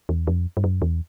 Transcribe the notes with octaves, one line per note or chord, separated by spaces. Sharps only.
E2
F2
G2
F#2
E2